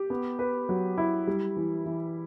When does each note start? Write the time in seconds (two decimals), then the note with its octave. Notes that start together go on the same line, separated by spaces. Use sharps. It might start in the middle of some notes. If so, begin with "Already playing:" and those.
Already playing: G4
0.10 B3
0.39 B4
0.69 F#3
0.98 E4
1.27 G3
1.57 E3
1.86 E3